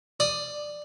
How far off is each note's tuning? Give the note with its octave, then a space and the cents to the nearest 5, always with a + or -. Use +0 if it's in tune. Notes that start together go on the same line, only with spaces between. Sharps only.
D5 +10 D#6 +0